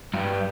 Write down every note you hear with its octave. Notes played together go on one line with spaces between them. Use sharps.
G2